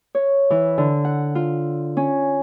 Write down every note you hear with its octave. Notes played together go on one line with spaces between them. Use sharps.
C#5
E3
D3
F#5
F4
C#4